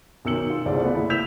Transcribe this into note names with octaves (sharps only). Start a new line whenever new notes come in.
B1 D#3 E6 C#7 F#7
F4
C2 C#3 G#3 C4 D5 F5
A3 B3
F#1 E4
E6 G6 G#6 B6 E7 F7